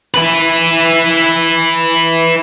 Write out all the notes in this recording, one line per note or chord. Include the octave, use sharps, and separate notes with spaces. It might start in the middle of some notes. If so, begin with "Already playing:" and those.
E4 B4